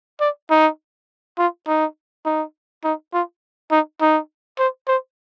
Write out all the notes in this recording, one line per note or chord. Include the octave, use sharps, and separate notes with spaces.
D5
D#4
F4
D#4
D#4
D#4
F4
D#4
D#4
C5
C5